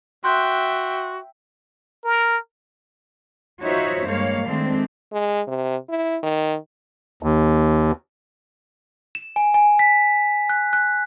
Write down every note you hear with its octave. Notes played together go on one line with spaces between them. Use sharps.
F#4 E5 G5 C6 F#6 G6
A#4
D#4 F4 F#4 C5 C#5 E5
G2 G#3 A#3 C#5 F5
D#3 G#3 A3 C4 D4
G#3
C3
E4
D#3
D#2
E7
G#5
G#5
B6
F#6
F#6